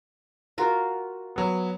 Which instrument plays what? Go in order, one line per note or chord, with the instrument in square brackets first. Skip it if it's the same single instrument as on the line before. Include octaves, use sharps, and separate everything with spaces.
[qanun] F4 F#4 A#4
[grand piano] F#3 B3